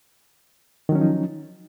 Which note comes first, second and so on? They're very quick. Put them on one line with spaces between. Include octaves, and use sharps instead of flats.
D#3 F#3 C#4 F3 D#4